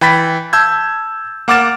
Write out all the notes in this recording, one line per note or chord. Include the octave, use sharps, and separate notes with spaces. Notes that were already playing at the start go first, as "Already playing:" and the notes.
E3 G5 B5 A6 B6
A5 E6 G6 G#6
A#3 F#5 D6 F6 A6 E7